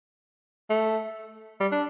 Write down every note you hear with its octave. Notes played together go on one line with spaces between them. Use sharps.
A3
G3
D4